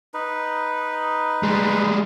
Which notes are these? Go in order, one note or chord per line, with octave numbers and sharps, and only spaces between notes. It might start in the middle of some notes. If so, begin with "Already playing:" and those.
D#4 B4
G3 G#3